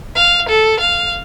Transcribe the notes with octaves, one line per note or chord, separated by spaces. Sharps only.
F5
A4
F5